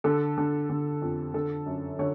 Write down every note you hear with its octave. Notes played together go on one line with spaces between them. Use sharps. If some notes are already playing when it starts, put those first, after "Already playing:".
D3 A4
D3
D3
F2
D3 A4
F#2
D3 C#5